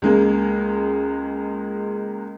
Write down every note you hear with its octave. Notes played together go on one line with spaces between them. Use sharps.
C#2 G#3 A#3